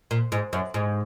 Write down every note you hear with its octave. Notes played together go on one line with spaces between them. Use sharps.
A#2
G#2
F#2
G#2